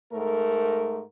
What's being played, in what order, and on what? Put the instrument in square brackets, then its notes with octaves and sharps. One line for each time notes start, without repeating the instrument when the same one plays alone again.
[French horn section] G#2 A3 A#4